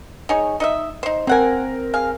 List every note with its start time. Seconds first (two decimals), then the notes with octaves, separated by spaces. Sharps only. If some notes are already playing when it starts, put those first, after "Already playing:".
0.29 D#4 G#4 C#5
0.60 D#4 D#5 E5
1.03 D#4 C5
1.27 A#3 C4 A#4 F#5 G#5
1.94 G#4 F5